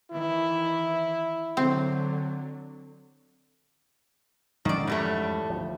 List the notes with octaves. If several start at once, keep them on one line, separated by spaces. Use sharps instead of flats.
D#3 E3 E4
D3 F#3 C4
F2 G#2 D#3 C#4 D5
E2 G3 A3
D2 F3